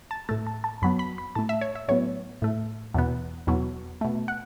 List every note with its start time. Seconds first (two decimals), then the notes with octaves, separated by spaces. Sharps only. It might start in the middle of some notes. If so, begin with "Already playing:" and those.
0.11 A5
0.29 A2 A3 A5
0.47 A5
0.64 A5
0.82 F#2 F#3 B3 B5
0.99 B5
1.18 B5
1.35 A2 A3 A5
1.49 E5
1.61 C#5
1.75 E5
1.88 A2 F#3 B3 C#5
2.42 A2 A3
2.94 E2 B2 B3
3.47 E2 B2 F#3
4.01 B2 A3
4.28 F#5